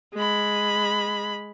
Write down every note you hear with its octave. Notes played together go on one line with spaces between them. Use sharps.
G#3 B5